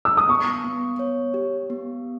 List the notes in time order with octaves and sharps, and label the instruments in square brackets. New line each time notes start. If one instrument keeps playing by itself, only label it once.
[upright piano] E6
D#6
[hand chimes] B3 [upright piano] C#6
[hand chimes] B3
C#5
G4
B3